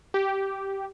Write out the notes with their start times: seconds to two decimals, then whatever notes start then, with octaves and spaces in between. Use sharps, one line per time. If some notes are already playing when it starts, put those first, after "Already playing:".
0.14 G4